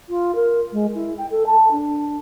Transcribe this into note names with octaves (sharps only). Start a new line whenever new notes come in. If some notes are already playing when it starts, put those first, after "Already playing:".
F4
A#4
G#3
E4
G5
A4
A5
D4